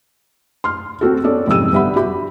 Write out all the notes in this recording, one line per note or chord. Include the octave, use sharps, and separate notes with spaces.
C6 F6
C4 F#4 A4
B3 C#4 A4 D5
F2 G#2 C3 G3 E6 D#7
G1 G3 B3 E5 F#5 B5
F#4 G4 E5 B5